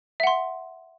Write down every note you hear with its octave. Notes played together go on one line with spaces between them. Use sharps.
E5 F#5 C6